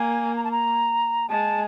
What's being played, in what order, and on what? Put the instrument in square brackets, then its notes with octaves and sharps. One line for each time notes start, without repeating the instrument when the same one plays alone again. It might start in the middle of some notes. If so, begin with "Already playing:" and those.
Already playing: [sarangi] A#3 [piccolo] G#5
[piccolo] A#5
A5
A#5
[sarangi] G#3 [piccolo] A5